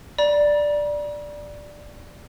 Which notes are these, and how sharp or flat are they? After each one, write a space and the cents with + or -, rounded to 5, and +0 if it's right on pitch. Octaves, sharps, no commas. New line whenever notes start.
D5 +0 A#5 +45